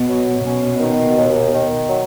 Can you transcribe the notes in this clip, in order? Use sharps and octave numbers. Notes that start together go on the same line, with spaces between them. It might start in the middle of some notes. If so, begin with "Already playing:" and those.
Already playing: B2
F#3
B2 C#4
D#3
D#2
D#3
F#3